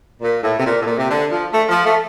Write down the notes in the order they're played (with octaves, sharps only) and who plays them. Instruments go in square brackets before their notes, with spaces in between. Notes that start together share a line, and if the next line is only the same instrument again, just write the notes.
[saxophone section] A#2
A2
C3
A#2
A2
A#2
C3
D3
F3
A3
F3
A3